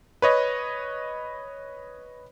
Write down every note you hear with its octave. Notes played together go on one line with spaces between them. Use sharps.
B4 C#5 D#5